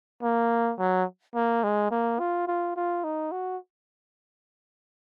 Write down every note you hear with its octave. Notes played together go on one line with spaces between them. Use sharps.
A#3
F#3
A#3
G#3
A#3
F4
F4
F4
D#4
F#4